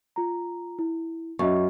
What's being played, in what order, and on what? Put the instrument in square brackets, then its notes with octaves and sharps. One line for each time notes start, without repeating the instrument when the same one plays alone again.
[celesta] F4 A#5
E4
[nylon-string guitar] F#2 [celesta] D#5 E5 C#6